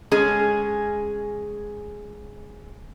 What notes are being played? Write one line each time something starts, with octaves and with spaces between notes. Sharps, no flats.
G#3 C#4 G#4